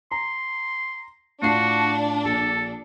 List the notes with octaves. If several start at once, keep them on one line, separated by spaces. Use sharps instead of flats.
A#5 C6
A2 D4 F4 F#4 C7
A#1 A4